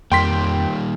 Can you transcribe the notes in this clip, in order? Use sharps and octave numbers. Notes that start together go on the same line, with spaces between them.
F2 D#3 G3 A#3 G5 C6 B6